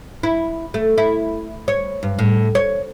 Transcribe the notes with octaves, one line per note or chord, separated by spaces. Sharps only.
E4
A3
E4
C#5
G2
A2
C#5